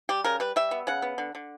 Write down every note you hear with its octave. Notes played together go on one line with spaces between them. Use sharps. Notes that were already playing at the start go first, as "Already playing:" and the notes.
G3 G4
C#3 A#4
G3 B4
G3 E5
B3
C#3 F#5
B3
D3
D3